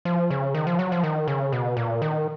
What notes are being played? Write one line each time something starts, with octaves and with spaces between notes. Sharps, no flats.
F3
C#3
D#3
F3
F#3
F3
D#3
C#3
B2
A#2
D#3